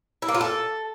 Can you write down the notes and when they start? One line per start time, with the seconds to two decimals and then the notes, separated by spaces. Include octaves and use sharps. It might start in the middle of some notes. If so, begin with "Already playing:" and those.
0.22 E4
0.28 A#3
0.35 F4
0.41 A4